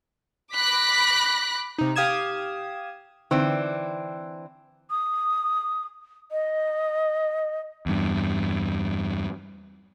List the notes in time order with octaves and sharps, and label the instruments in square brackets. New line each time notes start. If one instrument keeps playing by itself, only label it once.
[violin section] B5 D6 F#6 A#6 B6
[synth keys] C3 D#4
G4 F5 D#6 G#6 E7
[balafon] D3 D#4 [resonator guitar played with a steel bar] E3 C4 D4
[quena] D#6
D#5
[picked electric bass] E2 G2